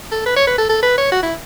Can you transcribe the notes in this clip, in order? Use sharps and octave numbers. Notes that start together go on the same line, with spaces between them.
A4
B4
C#5
B4
A4
A4
B4
C#5
F#4
E4